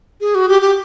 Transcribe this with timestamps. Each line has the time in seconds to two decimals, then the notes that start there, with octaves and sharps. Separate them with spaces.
0.21 G#4
0.35 F#4
0.49 G4
0.62 G4